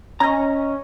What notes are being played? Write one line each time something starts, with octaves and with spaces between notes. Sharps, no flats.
C#4 D#5 A#5